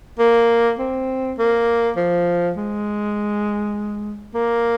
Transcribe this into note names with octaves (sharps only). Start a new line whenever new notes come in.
A#3
C4
A#3
F3
G#3
A#3